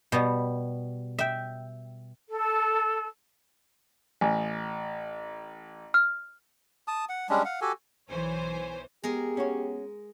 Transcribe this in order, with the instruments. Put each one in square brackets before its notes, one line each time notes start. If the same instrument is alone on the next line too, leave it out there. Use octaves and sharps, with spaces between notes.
[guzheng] B2 G3 B3
E5 G5
[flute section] A4
[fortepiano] A1 [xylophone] G#5
[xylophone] F6
[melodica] A5 D#6
F#5
G3 G#3 C#4 D4
F5 F#5
F#4 G4 A4 G#5
[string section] B1 E3 C5 C#5 G#5
[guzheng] G#3 G#4 A#4 [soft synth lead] B3 [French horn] G4
[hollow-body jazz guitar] C#4 F#4 C#5